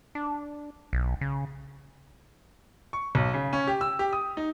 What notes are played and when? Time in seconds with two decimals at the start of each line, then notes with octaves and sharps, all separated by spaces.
0.15 D4
0.93 B1
1.21 C#3
2.93 C#6
3.15 B1
3.34 C#3
3.53 C#4
3.67 G4
3.81 E6
3.99 G4
4.13 D#6
4.37 D#4